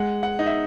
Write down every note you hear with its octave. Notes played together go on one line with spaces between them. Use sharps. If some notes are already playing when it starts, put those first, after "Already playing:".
Already playing: G#3 F#5
F#5
D#4
E5